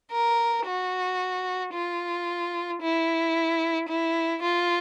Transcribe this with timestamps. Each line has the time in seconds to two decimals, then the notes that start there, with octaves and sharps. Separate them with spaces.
0.11 A#4
0.66 F#4
1.73 F4
2.82 E4
3.89 E4
4.42 F4